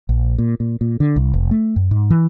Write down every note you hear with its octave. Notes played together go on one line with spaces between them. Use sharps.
A#1
A#2
A#2
A#2
D3
C2
F1
A3
F#2
G#2
E3